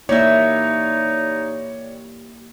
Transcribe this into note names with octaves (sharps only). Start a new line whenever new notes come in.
G3 A#3 D#4 E4 C#5 D5 E5